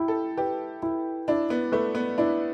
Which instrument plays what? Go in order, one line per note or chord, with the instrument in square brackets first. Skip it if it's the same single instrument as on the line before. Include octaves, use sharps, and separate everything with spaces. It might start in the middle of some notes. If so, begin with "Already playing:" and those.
Already playing: [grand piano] E4 [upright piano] G4
[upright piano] A4
[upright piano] G4 [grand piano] B4
[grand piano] E4
[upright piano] D4 [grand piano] E4
[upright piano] B3
[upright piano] A3 [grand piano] B4
[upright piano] B3
[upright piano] D4 [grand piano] E4